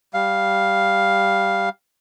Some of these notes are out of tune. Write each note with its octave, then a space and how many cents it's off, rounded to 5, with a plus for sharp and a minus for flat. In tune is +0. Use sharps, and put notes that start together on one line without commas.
G3 +0 F5 +0